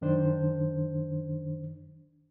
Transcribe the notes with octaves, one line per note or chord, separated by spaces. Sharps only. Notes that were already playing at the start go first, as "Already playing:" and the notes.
F#2 D#3 D4 C5